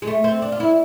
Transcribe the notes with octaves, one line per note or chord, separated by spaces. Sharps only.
G#3
A3
C4
D4
F4
E4